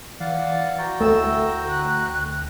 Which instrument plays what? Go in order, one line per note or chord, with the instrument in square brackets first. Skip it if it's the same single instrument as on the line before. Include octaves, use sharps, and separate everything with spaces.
[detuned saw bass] E3 [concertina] D5 F5 F#5
[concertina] F#4 G5 A#5
[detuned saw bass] D2 [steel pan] A3 [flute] E6
[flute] F#6